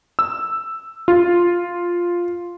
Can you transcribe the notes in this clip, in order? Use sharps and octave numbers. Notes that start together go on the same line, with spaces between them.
E6
F4